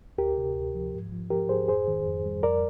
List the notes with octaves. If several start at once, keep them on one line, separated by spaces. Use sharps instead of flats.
D2 G4 A#4
C3
D2
F3
G#2
F3
F3 G4 A#4
G#2 G#4 C5
F2 G#4 C5
D#3
F2
G3
F2 A#4 D5